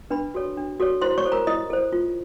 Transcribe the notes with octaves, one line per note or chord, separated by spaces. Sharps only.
D4 B4 B5
F#4 A4 C#5
D4
F#4 A4 C#5
E4 C5 C6
C#5 C#6
A4 C5
A#4 A#5
E4 D#5 D#6
A4 C5
F4